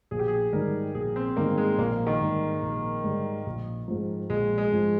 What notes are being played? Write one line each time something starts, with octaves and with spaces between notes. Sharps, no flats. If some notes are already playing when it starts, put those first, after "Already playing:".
A#1 G#4
G4
G#4
G#2 D#3 G3 A#4
A#1 G#4
C4
G#2 D#3 G3 A#3
G#3
A#1 A#3
D#3
G#2 D#3 G3
A#1
G#2 D#3 G3
A#1
G#2 F3
A#1 G#3
G#3
G#2 F3